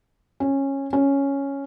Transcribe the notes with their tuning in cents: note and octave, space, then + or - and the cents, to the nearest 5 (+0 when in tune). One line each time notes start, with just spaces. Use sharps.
C#4 -15
C#4 +0